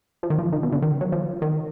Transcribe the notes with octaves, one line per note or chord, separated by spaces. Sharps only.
F3
D#3
F3
D#3
B2
D3
D#3
F#3
F3
D#3